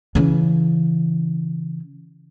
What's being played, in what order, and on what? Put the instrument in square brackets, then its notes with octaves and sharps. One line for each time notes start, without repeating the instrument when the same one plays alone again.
[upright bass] C#3 E3